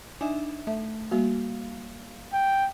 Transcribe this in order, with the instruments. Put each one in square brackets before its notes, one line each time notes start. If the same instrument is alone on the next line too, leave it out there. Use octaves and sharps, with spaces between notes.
[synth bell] D4 D#4 E5 [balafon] G#5
[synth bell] A3 [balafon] E5
[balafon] G3 A#3 F#4 [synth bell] F5
[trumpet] G5